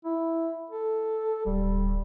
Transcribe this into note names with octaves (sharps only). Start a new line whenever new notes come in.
E4
A4
D1 G3